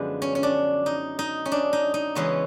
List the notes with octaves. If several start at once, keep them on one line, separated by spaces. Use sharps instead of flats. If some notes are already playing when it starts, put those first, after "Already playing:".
Already playing: F#2 D3 F3 G#3 B3 D4
C#4
C#4
D4
D#4
D#4
C#4
D4
D#4
D#4
C#3 E3 G#3 B3 C#4